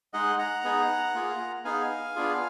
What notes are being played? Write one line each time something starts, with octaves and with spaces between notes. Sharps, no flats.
G#3 D#4 G#4 D#5 F#5
F#5 A#5
B3 D#4 G#4
A#3 F4 G#4
B3 D#4 G#4 F5 G#5
B3 D4 F4 G#4